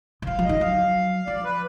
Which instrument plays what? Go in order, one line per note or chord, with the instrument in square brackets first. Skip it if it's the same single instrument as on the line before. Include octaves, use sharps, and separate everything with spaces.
[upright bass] D#3
[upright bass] F3 [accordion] F5
[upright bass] F3
[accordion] D#5
[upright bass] D#3
[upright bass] F#3 [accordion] F5
[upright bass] F3 [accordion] D5
[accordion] B4